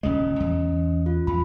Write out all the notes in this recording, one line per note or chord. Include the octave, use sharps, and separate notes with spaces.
D#1 C#2 G#3 C#4 D#5
E2
F4
E2 B5